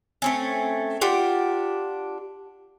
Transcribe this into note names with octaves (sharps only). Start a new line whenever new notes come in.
A3 C4 C#4
D4 F4 G4 F#5